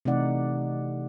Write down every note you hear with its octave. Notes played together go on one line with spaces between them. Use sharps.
C3 E3 A3 D#4 D5 F#5